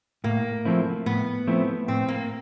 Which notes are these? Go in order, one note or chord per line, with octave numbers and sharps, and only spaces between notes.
A2 A#3
F3 A3 C4 E4
A2 B3
F3 A3 C4 E4
A2 C4
A#3